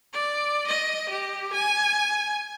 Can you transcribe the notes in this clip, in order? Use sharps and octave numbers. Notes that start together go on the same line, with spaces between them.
D5
D#5
G4
G#5